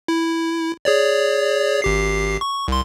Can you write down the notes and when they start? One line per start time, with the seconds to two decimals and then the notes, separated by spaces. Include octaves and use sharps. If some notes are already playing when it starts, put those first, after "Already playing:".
0.08 E4
0.85 G#4 C#5 D5
1.82 G#1 G4 C7
2.41 C#6
2.68 C2 C6